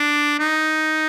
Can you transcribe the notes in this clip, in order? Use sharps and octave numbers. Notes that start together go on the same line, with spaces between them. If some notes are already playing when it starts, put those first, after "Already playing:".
Already playing: D4
D#4